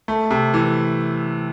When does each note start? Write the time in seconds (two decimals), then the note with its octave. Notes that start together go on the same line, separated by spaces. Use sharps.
0.08 A3
0.31 C3
0.54 E3